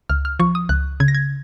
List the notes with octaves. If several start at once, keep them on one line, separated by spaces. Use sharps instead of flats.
C#2 F6
F6
F3 C#6
D#6
C#2 F#6
C#3 G#6
A#6
G#6